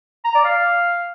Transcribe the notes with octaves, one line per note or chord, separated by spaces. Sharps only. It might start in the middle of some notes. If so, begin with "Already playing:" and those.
A#5
D5
F5